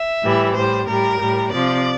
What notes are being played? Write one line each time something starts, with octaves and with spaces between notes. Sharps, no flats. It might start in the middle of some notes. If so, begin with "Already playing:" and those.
Already playing: E5
A2 E3 G3
A2 G3 C5
A2 G3 A#4
A2 G3
C3 F3 D5